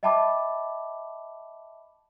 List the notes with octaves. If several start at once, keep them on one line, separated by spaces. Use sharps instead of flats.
D#5 E5 G5 A5 B5 D6